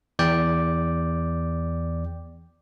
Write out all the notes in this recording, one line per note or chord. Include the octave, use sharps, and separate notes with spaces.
E2 D5 G5